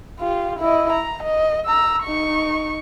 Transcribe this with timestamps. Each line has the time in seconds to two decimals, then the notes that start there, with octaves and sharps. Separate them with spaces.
0.20 F4 G4
0.59 E4 D#5
0.92 A#5
1.23 D#5
1.66 A#5 E6
2.03 D#4 C#6